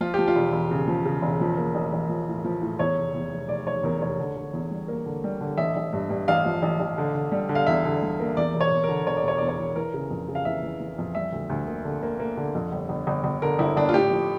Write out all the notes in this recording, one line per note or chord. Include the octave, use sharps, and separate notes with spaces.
F3 F4
F3 G4
F4
E1
E1
C#3
F3
C#3
E1
F3
A#3
A1
A1
F3
A2
F3
A2
E2 C#5
F1
E2
F1
F1 D5
F1 C#5
E2 A#4
F1 C#5
D3
D3
E2
G3
A#3
D3
G3
D3
A1 E5
A1
G2
G2
A1 F5
F3
A1
A1
D3
D3
G3
D3
F5
E2 E5
D3
G3
A#3
E2 D5
E1
C#5
E2
A#4
D3
E1 C#5
D5
E1 C#5
E2 D5
C#5
E2
E3 A#4
C#3
F2
C#3
F5
E3 E5
E3
E3
F2
G3 E5
D2
D2
A#3
D3
A#3
A#3
D3
F2
G1
G1
G1
G1
D3 A#4
G1 E4
G1 D4
F4
A2 G4
F3